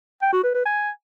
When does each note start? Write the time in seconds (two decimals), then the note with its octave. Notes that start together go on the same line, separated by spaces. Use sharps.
0.22 G5
0.33 F#4
0.44 B4
0.54 B4
0.65 G#5